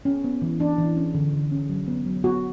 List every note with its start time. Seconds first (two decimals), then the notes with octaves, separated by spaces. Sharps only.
0.05 B3 C#4
0.24 B3
0.42 E3
0.60 E3 D4
0.78 E3
0.97 C#4
1.14 D3
1.33 D3
1.52 C#4
1.70 F#3
1.88 B3
2.06 F#3
2.24 B3 F#4